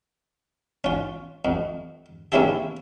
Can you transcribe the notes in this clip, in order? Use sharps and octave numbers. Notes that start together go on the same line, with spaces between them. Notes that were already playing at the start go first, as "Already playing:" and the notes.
C#4 F4
F2
A#3 C4 C#4 E4 G4 G#4